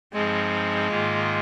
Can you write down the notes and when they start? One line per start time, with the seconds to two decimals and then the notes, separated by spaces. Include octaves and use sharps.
0.13 G2 F3 G#3 C4 D#4
0.88 G#2 D#3 A#3 F4